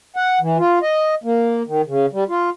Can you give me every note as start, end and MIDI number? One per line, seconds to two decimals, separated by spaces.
0.17 0.39 78
0.41 0.58 52
0.58 0.79 65
0.82 1.15 75
1.24 1.63 58
1.67 1.82 51
1.86 2.06 49
2.13 2.24 55
2.29 2.50 65